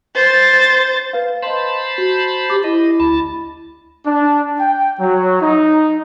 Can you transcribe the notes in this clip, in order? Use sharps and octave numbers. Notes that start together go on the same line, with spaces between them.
C5 A6
B4 F5
C5 D#5 A5 B5 C6
F#4
G4 D6
E4 D#5
D2 A5 B5
D4
G5
F#3
D#4